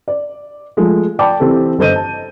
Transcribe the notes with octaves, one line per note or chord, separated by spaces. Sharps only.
D5
F3 G#3 A3
D5 G5 A5 B5 D6
E3 C4 G4 A4
G1 A4 C5 D#5 G6 D#7
A5